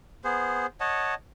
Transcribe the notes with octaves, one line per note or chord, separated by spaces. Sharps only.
B3 G#4 C5
C#5 D#5 F#5 A5